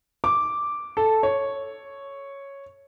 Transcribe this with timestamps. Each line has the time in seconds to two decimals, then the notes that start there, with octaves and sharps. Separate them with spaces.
0.24 D6
0.97 A4
1.23 C#5